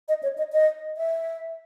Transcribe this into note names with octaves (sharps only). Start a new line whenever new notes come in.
D#5
C#5
D#5
D#5
E5